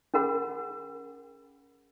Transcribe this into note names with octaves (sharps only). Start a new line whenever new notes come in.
C#4 G#4 A#4 F#5 B5